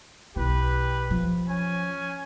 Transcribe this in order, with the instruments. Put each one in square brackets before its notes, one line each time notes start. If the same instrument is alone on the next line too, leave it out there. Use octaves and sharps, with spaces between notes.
[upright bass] B1 E4 [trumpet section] G4 B4
[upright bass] F3
[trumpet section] C#4 G#5